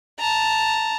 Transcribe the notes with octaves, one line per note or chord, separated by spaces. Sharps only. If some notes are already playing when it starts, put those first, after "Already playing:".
A5 A#5